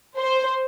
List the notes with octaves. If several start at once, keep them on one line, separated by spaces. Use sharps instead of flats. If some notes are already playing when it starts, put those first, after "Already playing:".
C5